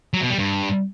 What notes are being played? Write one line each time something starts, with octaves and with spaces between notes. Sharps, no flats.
F#3
B2
G3
G2